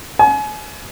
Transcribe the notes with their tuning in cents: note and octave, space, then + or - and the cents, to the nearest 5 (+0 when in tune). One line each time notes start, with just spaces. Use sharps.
G#5 +35